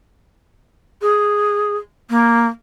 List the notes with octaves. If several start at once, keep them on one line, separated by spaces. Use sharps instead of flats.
G#4
A#3